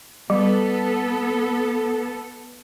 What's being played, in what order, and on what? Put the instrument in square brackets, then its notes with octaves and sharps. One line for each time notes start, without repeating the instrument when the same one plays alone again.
[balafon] G3 [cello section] B3 A4